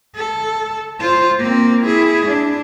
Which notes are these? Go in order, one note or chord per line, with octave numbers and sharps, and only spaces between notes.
A4
F4 C5
A#3 C4
E4 G#4
D4